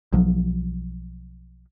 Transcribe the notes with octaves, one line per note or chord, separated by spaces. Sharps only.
B1 F3 F#3